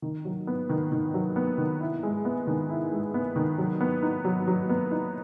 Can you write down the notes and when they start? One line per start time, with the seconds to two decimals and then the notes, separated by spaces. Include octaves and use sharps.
0.02 D#3
0.25 F#3
0.47 B3
0.69 D#3
0.92 D#3
1.14 F#3
1.36 B3
1.58 D#3
1.80 E4
2.03 G#3
2.25 B3
2.47 D#3
2.69 E4
2.92 G#3
3.14 B3
3.36 D#3
3.58 F#3
3.81 B3
4.03 D#4
4.25 F#3
4.48 F#3
4.69 B3
4.91 D#4